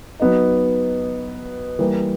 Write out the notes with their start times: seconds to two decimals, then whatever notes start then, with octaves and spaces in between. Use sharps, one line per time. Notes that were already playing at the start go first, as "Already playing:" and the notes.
0.20 F#3 B3 D#4
1.79 E3 G3 A#3